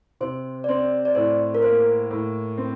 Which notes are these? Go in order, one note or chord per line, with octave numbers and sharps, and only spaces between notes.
C3 C5
D5
C4 C5
D5
A2 C5
A#4
A#3 C5
A2
C4